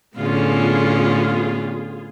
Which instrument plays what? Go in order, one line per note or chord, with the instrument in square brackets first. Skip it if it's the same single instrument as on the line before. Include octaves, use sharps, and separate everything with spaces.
[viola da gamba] A2 D3 C#4 [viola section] B3 F4 G#4